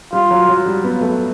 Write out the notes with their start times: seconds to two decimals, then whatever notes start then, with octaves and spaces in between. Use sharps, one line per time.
0.13 G3 F4
0.31 F#3
0.49 F#3
0.66 G3
0.84 B3
1.01 A3